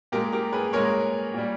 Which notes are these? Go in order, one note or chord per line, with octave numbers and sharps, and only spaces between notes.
A#2 G#3 G4 A#4
G4 A#4
G#4 B4
A#2 G#3 A#4 C#5
A#2 G3